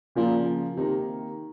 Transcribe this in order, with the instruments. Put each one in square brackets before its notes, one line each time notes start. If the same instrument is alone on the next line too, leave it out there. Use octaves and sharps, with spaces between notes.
[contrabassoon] A#2 [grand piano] C#3 F3 A#3
[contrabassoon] C3 [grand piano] D#3 A#3 D#4 G4